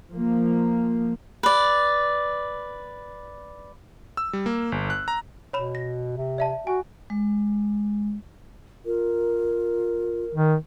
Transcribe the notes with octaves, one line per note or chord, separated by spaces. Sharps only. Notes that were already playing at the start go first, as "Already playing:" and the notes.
F3 A#3
B4 D5
E6
G3
A#3
G1
F#6
A#5
B2 C#5 B5 E7
A#6
C3
D5 E5 A5
F#4 G#5
G#3
F4 A#4
D#3